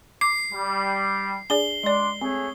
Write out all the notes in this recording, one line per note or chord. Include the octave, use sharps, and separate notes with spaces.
D6 C7
G3
D4 G#4 D5 G7
G#3 D4 D5 C6
A3 C4 G#4 C#5